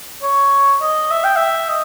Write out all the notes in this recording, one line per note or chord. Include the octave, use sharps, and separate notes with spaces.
C#5
D#5
E5
G5
E5
D#5